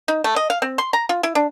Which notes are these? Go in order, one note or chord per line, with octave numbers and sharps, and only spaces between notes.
D#4
A3
D#5
F5
C4
C6
A#5
F4
E4
D4